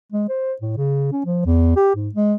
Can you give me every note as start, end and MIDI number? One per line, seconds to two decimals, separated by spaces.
0.12 0.25 56
0.29 0.53 72
0.61 0.72 45
0.77 1.08 49
1.12 1.22 61
1.25 1.45 53
1.45 1.75 40
1.76 1.94 67
1.95 2.09 44
2.14 2.35 56